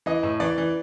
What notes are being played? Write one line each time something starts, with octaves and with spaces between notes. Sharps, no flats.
E3 D#5
A2
E3 D5
E3